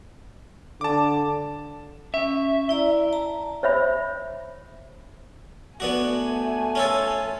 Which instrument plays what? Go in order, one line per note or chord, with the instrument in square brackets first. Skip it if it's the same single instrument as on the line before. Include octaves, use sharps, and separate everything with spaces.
[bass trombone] D3 [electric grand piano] A5 D6
[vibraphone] C#4 [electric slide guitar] E5
[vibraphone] E4 D5 A#5
A5 A#5
[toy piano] C5 C#5 E5 B5
[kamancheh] A3 G#5 [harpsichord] B3 D4 F#4
[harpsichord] C#4 F4 A4